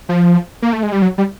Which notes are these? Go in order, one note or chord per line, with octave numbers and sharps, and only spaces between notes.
F3
A#3
A3
G#3
G3
F#3
G3